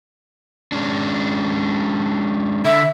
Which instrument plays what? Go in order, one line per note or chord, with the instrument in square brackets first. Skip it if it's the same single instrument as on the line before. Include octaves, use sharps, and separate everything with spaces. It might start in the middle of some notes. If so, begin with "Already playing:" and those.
[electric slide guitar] G#3 C#4 D4
[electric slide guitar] D3 [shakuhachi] E5